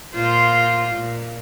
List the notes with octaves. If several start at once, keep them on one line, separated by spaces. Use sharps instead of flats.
A#2 F4 C5
A#2